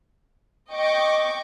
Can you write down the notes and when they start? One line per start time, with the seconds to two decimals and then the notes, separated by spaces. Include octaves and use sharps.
0.71 D#5 G5 C#6 D6